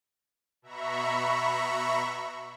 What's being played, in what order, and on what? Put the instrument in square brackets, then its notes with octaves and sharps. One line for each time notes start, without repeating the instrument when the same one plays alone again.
[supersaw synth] B2 E5 A#5 B5 C#6